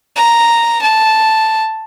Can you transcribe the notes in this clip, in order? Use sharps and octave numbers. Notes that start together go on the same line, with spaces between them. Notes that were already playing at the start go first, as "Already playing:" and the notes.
A#5
A5